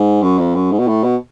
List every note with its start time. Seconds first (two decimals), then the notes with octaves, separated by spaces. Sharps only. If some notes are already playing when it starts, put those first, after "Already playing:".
Already playing: G#2
0.22 F#2
0.38 F2
0.55 F#2
0.72 G#2
0.79 B2
0.88 A2
1.04 B2